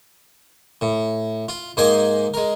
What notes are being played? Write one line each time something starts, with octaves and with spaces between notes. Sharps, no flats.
A2
F4
G#2 A#3 C5 D#5 G5 G#5
G#3 A#4